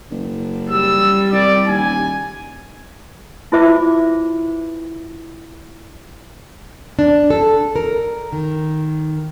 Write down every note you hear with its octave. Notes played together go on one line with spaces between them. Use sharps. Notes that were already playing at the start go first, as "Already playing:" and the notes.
F#1
G3 E6
C2 D5
D#1 G#5
E4 F4 B4 C5 E5 D6
D4
A4
A#4
D#3